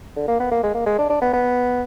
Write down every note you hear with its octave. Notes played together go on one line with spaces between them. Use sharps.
D3
A#3
B3
A#3
G#3
A#3
G#3
D4
D4
B3
B3